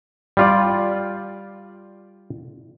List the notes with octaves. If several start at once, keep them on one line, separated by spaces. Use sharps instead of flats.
G3 F4 D5